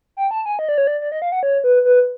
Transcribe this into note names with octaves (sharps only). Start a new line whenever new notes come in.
G5
A5
G#5
D#5
D5
C#5
D5
D5
D#5
F5
F#5
C#5
B4
B4